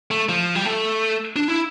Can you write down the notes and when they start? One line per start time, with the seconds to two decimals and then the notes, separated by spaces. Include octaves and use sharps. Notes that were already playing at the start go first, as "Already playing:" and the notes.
0.11 A3
0.29 F3
0.55 G3
0.65 A3
1.36 D4
1.48 E4